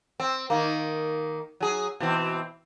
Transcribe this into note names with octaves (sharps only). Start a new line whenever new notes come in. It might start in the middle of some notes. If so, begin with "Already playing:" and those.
C4
D#3 A#3
F#3 G#4
B2 E3 C4